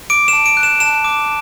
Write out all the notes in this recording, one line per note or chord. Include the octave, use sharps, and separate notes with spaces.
D6 D7
E7
A5
D7
F#6
E7
A5 E7
D6